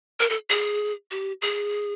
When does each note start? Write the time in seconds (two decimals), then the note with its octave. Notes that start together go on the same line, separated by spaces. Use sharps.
0.20 A#4
0.30 A4
0.50 G#4
1.11 G4
1.42 G#4